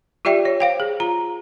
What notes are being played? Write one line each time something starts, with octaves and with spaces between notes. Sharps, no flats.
F4 G4 D5 E5 G5
C#5
C5 F5 G5
G#4
F4 A#5